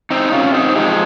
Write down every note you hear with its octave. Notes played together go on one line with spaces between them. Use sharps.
C4 D#4
C3 C#4 F4
C4 D#4
F3 G#3 D#4 G4